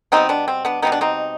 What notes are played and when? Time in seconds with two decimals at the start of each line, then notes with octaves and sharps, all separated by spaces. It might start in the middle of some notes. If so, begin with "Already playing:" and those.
0.12 B2 G3 B3 C4 D#4
0.29 B3 D4
0.48 C4
0.65 B3 D4
0.82 B2 G3 B3 D#4
0.92 D4
1.01 C4 D#4